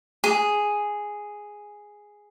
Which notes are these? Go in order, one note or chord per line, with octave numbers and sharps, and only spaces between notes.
G#4